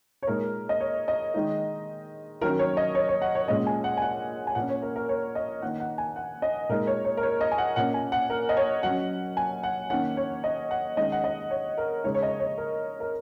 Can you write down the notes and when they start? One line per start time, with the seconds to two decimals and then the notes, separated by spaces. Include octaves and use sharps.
0.23 C#5
0.27 A#2 G#3 D#4 A#4
0.69 D#5
0.80 C#5
1.08 D#5
1.34 D#3 G#3 D#4
2.41 D#3 F#3 C#4 A#4
2.59 C#5
2.77 D#5
2.95 C#5
3.08 C#5
3.22 F#5
3.35 C#5
3.48 A#2 G#3 C#4 D#5
3.66 G#5
3.84 F#5
3.97 G#5
4.02 F#5
4.47 G#5
4.55 A#2 A#3 C#4 F#5
4.69 C#5
4.82 A#4
4.96 A#4
5.09 C#5
5.35 D#5
5.62 D#3 A#3 D#4 F#5
5.80 F#5
5.98 G#5
6.16 F#5
6.42 D#5
6.69 A#2 G#3 D#4 A#4
6.87 C#5
7.05 C#5
7.17 A#4
7.23 C#5
7.41 D#5
7.51 G#5
7.58 F#5
7.76 A#2 A#3 C#4 F#5
7.94 G#5
8.12 F#5
8.30 A#4
8.49 D#5
8.57 C#5
8.83 F#3 C#4 F#5
9.37 G#5
9.63 F#5
9.90 D#3 A#3 C#4 F#5
10.17 C#5
10.44 D#5
10.71 F#5
10.97 D#3 G#3 C#4 D#5
11.12 F#5
11.24 D#5
11.50 C#5
11.78 A#4
12.04 C#3 G#3 D#4 C#5
12.14 C#5
12.22 D#5
12.40 C#5
12.58 A#4
13.00 A#4